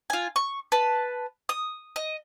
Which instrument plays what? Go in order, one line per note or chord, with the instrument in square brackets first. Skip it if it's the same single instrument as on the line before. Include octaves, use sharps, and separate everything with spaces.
[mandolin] F4 G#5
C#6
B4 A5
D#6
D#5